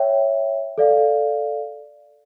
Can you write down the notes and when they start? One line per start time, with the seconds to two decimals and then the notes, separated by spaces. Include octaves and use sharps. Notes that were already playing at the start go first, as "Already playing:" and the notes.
Already playing: C#5 E5 G5
0.78 A4 D5 F5